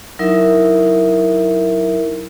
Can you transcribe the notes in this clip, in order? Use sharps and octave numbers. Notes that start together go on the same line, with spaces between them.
F#3 D#4 E4 A#4 E5